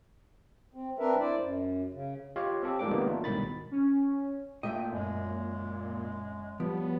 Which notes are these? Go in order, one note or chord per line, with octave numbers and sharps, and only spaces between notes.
C4
C4 D4 A#4 B4 E5
E4 C5 D5
F#2
C#3
F4 G4 C#5 D#5 F5
C4 G4 A4
G#2 F3 G3 A#3 D4 D6
C3 D#3 G#3 A#3 B3
F#3 A3 D4 D#4 F4
C2 G#2 B2 D#3 B5 A6
C#4
A#2 A3 F4 D#5 E5 G5
F#2 G#3
F3 G3 B3 F#4 C#5